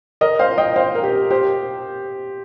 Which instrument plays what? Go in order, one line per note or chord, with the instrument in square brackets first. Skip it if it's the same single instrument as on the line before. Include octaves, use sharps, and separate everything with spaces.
[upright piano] A#4 D#5
C5 F5
D#5 G5
C5 F5
A#4
G4
G4 C5